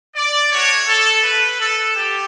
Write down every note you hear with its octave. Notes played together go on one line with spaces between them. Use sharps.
D5
A3 D4 F#4 C#5
A4
A3 E4 G4 B4
A4
B3 G4